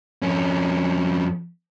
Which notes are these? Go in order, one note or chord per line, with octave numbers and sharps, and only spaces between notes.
F2 C#4